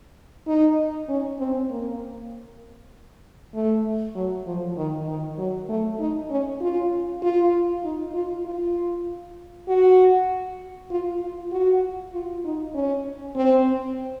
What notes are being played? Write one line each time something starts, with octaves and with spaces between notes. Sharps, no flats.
D#4
C#4
C4
A#3
A3
F#3
F3
D#3
D#3
F#3
A3
D#4
C#4
F4
F4
D#4
F4
F4
F#4
F4
F4
F#4
F4
D#4
C#4
C4